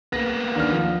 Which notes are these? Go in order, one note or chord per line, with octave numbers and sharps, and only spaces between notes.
A#3 B3 A#6
D#2 D4 F6
F3